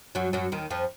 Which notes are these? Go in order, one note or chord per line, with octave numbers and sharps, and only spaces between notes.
F#2 F#3
F#2 F#3
D#2 D#3
F2 F3